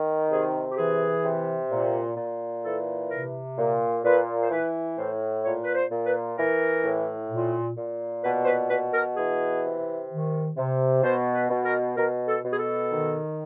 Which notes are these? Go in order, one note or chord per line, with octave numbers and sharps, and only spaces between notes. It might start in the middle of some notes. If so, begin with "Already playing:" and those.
Already playing: D#3
C3 G#4
G4
E3 G#4
C3
A#2
A#2
E3 A4
C3 A#4
A#2
A#2 B4
C5
E3 B4
A2 C5
A#2 C#5
B4
C5
A#2
B4
E3 A#4
A2
A#2
A#2
B2 B4
C5
B4
B2 B4
A#4
E3 G#4
C3
D#3
C3
B2 C5
B4
B2
A#4
B2 A#4
A4
B2
G#4
A4
D#3